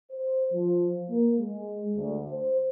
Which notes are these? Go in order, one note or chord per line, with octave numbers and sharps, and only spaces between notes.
C5
F3
A#3
G#3
D2
C5